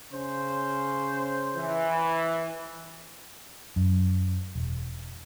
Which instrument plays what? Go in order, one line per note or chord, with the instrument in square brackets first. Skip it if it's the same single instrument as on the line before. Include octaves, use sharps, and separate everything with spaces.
[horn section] C#3 C#4 C5
[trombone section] E3
[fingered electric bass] F#2
E1